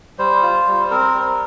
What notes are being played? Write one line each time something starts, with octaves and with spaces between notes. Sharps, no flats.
G3 C5
F4
G3
C4 A#4
G3